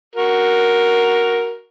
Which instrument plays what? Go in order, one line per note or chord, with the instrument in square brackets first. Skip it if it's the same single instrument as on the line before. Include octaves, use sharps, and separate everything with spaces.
[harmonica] F#4 A#4